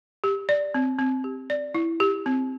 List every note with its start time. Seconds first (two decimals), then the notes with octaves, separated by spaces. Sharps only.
0.24 G4
0.49 D5
0.74 C4
0.99 C4
1.24 G4
1.50 D5
1.74 E4
2.00 G4
2.26 C4